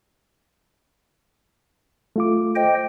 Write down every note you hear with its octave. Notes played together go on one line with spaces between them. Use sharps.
A3 F4 D6
C5 D#5 G5